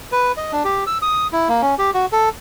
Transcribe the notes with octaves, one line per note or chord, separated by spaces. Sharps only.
B4
D#5
D4
G4
E6
D#6
E4
A#3
C#4
G4
F#4
A4